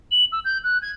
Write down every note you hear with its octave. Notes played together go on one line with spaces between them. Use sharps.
F#7
E6
G6
F#6
G#6